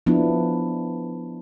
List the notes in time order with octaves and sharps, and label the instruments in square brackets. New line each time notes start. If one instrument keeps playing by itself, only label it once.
[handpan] F3 B3 D4 E4